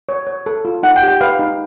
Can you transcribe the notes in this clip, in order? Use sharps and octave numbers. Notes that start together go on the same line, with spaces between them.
C#5
C#5
A4
F4
D#4 F#5
G5
G4
G5
B4 F5
D#4